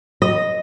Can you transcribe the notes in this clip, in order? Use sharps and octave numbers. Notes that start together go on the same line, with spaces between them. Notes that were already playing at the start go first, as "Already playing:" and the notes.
D#5